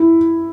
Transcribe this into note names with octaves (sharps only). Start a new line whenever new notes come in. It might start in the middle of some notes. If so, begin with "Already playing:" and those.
Already playing: E4